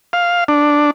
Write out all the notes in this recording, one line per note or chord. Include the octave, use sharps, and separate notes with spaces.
F5
D4